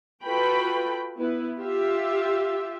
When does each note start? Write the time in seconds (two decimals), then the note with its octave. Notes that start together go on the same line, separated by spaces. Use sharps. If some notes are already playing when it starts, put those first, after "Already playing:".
0.24 F4 F#4 A4 B4 G5 B5
1.16 B3 E4 B4
1.59 F4 G4 E5